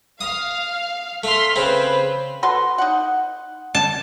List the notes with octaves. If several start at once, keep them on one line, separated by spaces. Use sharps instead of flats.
F5 D#6
A3 C6 F6 B6
C#3 C4 B4 C5
F#4 A4 B4 C6
D#4 F#5
A5